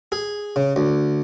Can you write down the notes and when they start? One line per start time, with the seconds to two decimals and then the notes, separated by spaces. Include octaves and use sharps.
0.12 G#4
0.56 C#3
0.76 D2